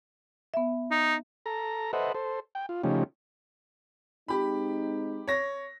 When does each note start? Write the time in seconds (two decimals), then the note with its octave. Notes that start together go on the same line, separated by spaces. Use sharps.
0.54 B3 E5
0.91 D#4
1.46 A4 A#5
1.93 A4 B4 C5 D#5 E5 F#5
2.15 A4 C5
2.55 G5
2.69 F4
2.84 C#3 F3 A3 C#4 D#4 G4
4.28 G#3 C4 D#4 G4 B5
5.28 C#5 A#6